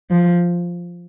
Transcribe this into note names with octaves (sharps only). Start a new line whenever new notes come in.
F3